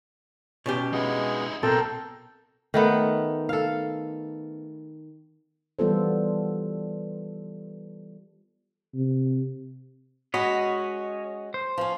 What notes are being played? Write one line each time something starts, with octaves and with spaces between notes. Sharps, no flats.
B2 C#4 G4
G#3 B3 D#4 E4 G#4
B1 B2 C4 A4 A#4 G5
D#3 A3 B3
A4 F5
E3 G3 B3 F4 A4 C5
C3
G#3 C#4 F#4 C#5 D#5 B5
C5
F3 C#4